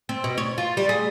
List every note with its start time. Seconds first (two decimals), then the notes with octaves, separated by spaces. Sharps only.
0.09 C4
0.24 B2
0.38 C#5
0.58 F4
0.77 G3
0.89 G#4